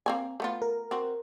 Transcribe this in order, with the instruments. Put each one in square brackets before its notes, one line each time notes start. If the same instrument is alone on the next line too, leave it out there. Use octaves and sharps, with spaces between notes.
[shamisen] A#3 C4 G#5
A3 B3 F4
[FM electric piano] A#4
[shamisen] C4 F#4